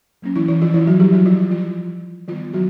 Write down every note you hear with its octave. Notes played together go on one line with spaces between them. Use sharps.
F#3 A#3 C#4
E3 E4
E3 E4
F3 F4
E3 E4
F#3 F#4
G3 G4
F#3 F#4
F3 F4
F3 F4
D#3 F3 G3 B3 F4
F#3 F#4